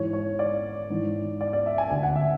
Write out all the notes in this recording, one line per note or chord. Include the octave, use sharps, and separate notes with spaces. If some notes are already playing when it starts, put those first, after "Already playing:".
Already playing: G#2 E3 C#5
C#5
D5
G#2 E3
D5
D5
E5
G#5
D2 D3 G#5
F#5
E5